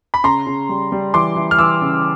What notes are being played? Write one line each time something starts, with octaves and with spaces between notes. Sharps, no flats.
B5
C#3 A#5 C6
C#3
G3
G3
E3 C6 D6
E3
F6
E3 D6 E6
C#3